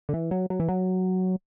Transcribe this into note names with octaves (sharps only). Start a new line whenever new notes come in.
D3
E3
F#3
F#3
E3
F#3